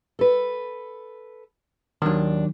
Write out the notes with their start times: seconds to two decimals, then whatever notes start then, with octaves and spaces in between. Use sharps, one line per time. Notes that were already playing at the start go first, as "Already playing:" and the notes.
0.19 A4 B4
2.02 D#2 D#3 F#3 D4